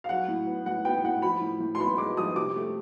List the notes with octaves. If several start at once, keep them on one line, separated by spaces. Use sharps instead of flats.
F5
F#3 F#5
A2
B3
A2 F#5
B3 G5
A2 F#5
F3 B5
A2
A2
C6
B3 B5
G#3 D6
F3 D#6
C3 D6
A3